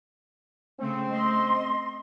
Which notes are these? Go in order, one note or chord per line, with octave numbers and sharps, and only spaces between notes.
C#3 A3 C4
A3 D#5 C6